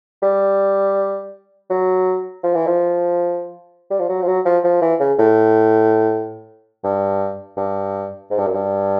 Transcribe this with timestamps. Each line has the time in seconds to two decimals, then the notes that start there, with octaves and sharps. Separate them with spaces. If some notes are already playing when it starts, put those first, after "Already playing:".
0.23 G3
1.70 F#3
2.43 F3
2.55 E3
2.67 F3
3.91 G3
4.00 F3
4.09 F#3
4.22 F3
4.27 F#3
4.45 F3
4.64 F3
4.81 E3
5.00 C#3
5.19 A2
6.84 G2
7.57 G2
8.30 G#2
8.38 G2
8.47 F#2
8.55 G2